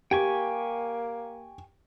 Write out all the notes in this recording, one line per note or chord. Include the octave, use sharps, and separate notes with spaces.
A#3 G4 G5 G#5 C#6